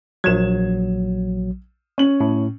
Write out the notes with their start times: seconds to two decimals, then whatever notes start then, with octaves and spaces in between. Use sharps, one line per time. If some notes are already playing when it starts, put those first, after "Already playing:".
0.24 A#1 F#3 G#6 E7
1.98 C#4 F#7
2.20 A2